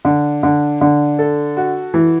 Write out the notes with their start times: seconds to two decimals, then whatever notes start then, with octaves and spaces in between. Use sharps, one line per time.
0.05 D3
0.43 D3
0.81 D3
1.19 A4
1.57 F#4
1.94 E3